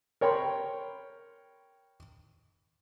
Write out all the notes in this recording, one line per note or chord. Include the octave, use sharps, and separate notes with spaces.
A#4 C#5 G5 B5 C6